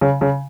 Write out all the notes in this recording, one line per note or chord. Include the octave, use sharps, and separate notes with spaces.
C#3
C#3